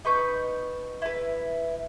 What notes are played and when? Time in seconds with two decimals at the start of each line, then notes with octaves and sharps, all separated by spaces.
0.05 D#4 B4 C#6 G6
1.02 E4 B4